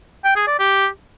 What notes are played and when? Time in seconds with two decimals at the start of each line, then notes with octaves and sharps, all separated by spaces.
0.25 G5
0.36 G#4
0.48 D5
0.59 G4